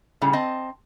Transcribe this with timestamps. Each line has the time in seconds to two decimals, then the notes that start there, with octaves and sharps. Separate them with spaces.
0.21 A2 C#3 G3
0.33 C4 D#5 A5